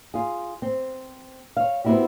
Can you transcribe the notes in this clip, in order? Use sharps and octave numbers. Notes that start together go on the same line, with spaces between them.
F4 G#4
C4
C#5 F5
B3 C4 D#4 E4 F#4 G4